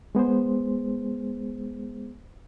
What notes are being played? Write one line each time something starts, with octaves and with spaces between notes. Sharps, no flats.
G#3 B3 G#4 C5